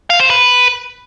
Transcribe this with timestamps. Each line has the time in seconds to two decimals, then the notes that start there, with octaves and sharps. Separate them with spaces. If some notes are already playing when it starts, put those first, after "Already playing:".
0.10 F5
0.20 C5
0.30 B4